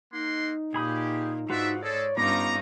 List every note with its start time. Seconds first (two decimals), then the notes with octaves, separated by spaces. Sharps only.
0.12 A#3 D#4 F#5 C6
0.74 A#2 G4 G#4 B5 D#6
1.50 G#2 D4 F4 F#4 B4 E5
1.83 G#3 A4 C#5 D5
2.17 G2 B3 C#4 D#4 F4 A#5 D6